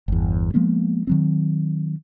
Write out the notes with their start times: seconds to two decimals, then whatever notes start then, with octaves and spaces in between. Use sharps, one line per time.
0.08 G1 E2
0.54 F3 G#3 A#3 B3
1.07 D#3 F#3 C4